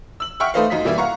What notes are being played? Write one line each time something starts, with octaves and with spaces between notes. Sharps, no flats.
E6 F#7
E5 F#5 G5 C#6 F6
A3 D#4 B4 C5 D#5 F5
F#2 D#4 B6
B2 E3 G3 A#3 E4
F5 F#5 A#5 C#6